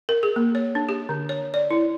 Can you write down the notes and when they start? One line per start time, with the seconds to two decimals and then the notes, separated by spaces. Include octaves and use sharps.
0.09 A#4
0.23 G#4
0.36 A#3
0.55 C#5
0.75 D4
0.89 G4
1.09 D3
1.29 C#5
1.54 D5
1.71 E4